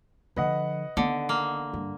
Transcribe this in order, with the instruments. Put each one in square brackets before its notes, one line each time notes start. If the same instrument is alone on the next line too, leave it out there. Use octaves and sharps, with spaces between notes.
[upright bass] D3 F3 [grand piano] B4 D#5 F#5
[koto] D3 [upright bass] D#3 B3
[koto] A#3
[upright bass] G2